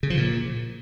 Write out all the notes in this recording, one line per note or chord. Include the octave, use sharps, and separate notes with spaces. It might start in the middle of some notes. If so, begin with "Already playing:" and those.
C#3
F3
A#2